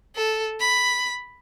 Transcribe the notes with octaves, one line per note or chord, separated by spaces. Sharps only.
A4
B5